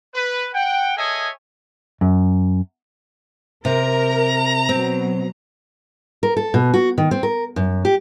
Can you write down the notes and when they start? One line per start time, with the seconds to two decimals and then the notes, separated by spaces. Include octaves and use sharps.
0.14 B4
0.54 F#5 G5
0.97 G#4 A4 C#5 D#5 E5 G#5
2.01 F#2
3.65 C3 A#4 A#5
4.69 B2 F#3 C4
6.23 A#4
6.37 A4
6.54 B2
6.74 F#4
6.98 D#3
7.11 C4
7.23 A#4
7.56 F#2
7.85 G4